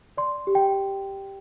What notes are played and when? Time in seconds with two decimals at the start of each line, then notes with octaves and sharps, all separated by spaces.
0.17 D5 C6
0.47 G4
0.55 G5